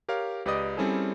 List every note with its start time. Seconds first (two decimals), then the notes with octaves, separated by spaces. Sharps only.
0.09 G4 A#4 C#5 F5
0.45 C#2 G4 B4 D5 D#5 D#6
0.77 G3 C4 C#4 E4 G#4 A4